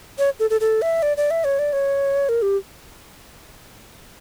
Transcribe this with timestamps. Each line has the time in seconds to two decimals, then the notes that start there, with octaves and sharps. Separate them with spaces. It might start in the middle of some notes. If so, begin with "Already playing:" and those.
0.19 C#5
0.40 A4
0.50 A4
0.61 A4
0.82 E5
1.02 D5
1.17 D5
1.31 E5
1.44 C#5
1.59 D5
1.73 C#5
2.29 A#4
2.42 G4